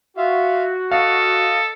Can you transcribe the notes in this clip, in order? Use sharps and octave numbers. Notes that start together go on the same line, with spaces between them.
F4 F#4 E5 F5
A4 D#5 F5